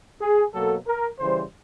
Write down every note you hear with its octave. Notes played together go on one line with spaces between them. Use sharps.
G#4
B2 F#3 A#3 A4
A#4
C#3 E3 G3 C5